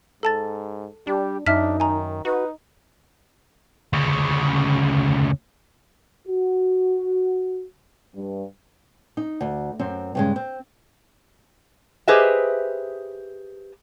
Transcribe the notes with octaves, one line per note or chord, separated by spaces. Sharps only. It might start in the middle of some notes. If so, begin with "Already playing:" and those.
G#2 A4 A5 A6
G3 D4 G4
F#2 D4 D#4 E5 F6 B6
D#3 G#5 A#5
D#4 F#4 B4
D2 C#3
F#4
G2
D#4
D2
F#2 C4
G2 C#3 G#3
C4
G4 G#4 B4 C5 D#5 E5